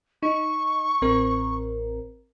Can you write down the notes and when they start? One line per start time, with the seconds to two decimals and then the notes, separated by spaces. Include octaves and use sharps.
0.23 D#4 C#6
1.02 A1 C4 A#4